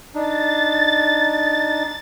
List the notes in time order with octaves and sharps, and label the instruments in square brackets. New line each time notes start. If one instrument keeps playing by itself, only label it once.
[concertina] D4 D#4 [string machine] A6